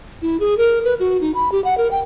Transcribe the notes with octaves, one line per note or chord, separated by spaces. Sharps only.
E4
G#4
A#4
B4
F#4
D#4
B5
G4
F#5
A#4
G5